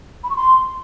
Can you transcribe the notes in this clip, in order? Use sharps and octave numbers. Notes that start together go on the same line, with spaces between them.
B5
C#6
C6